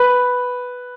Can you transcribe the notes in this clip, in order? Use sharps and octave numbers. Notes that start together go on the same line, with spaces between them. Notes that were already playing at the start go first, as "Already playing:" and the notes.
Already playing: B4